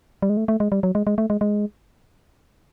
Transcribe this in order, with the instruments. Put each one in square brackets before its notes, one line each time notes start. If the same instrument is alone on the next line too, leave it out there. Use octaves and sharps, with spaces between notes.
[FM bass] G3
G#3
A3
A3
G#3
G3
F#3
G#3
G#3
A3
G#3
G#3